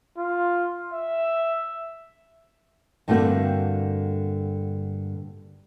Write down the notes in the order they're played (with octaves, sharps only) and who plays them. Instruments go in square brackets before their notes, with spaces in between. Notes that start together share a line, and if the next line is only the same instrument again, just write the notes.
[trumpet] F4
E5
[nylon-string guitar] G2 D3 A3 A#3 C4 F#4